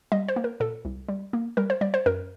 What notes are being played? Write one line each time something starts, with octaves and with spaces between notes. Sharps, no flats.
G3 D#5
C5
A#3
A#4
A#2 A4
C2
G3
A#3
G3 A#4
C5
G3 D5
C5
F#2 A#4